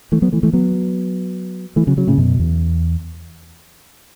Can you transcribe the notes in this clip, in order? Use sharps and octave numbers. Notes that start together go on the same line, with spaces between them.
E3 A3
F#3 B3
E3 A3
E3 A3
F#3 B3
E3 A3
C#3 F#3
C#3 F#3
A2 C#3
F#2 B2
E2